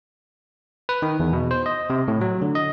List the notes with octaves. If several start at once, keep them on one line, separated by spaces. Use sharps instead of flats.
B4
D#3
E2
B2
C5
D#5
C3
A2
F#3
D3
D#5